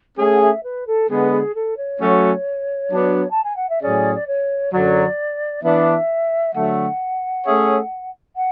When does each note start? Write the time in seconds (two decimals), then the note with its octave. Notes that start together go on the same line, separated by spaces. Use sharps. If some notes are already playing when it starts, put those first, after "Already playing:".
0.18 A3 C#4 G#4 G#5
0.35 F#5
0.41 E5
0.63 B4
0.87 A4
1.09 D3 G#3 B3 G#4
1.32 G#4
1.55 A4
1.77 C#5
2.00 F#3 A3 C#4 F#4
2.90 F#3 B3 D4 F#4
3.30 A5
3.44 G#5
3.56 F#5
3.69 E5
3.82 A2 F#3 C#4 G#4 D5
4.15 D5
4.27 C#5
4.72 F#2 D3 F#3 D5
5.63 E3 B3 D4 E5
6.54 D3 F#3 A3 F#5
7.45 A3 C#4 G#4 C#5 E5
8.36 F#5